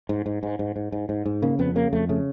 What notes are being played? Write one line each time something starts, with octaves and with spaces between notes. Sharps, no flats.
G#2
G#2
G#2
G#2
G#2
G#2
G#2
G#2
C#3 A#3
F2 B3
C#3 A#3
F2 A3
C#3 A3